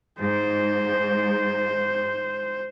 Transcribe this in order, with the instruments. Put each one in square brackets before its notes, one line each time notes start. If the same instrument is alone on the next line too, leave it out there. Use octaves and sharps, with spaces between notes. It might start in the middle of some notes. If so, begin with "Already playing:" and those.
[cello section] G#2 [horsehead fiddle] C5